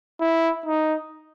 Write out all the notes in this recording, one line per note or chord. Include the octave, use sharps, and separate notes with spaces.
E4
D#4